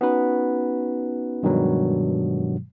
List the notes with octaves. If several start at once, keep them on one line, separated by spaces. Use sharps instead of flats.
B3 C#4 D#4 F#4 B4
G2 B2 D#3 F3 F#3 G#3